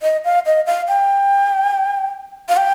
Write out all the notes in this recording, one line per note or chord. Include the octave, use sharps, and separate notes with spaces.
D#5
F5
D#5
F5
G5
F5
G5